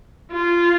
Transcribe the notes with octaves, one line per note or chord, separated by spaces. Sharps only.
F4